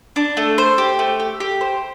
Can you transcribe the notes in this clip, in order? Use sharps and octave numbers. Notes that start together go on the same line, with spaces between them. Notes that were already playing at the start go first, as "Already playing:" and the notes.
D4
A3
C5
G4
A3
G4
G4
C5